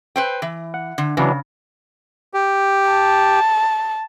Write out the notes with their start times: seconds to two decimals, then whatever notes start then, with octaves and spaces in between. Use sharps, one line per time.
0.16 B4 C5 G5
0.42 E3
0.74 F#5
0.98 D3
1.17 C#3 E3 F#3 D4
2.34 G4
2.90 A5